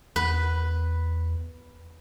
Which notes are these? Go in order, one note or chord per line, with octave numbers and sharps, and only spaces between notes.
E2 B4